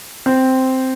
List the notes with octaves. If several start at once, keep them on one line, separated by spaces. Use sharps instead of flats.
C4